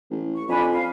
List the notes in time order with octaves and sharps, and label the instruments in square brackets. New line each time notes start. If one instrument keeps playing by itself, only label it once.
[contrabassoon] A1
[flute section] C#6
[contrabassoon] F2 [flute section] D4 G#5 B5
[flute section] F5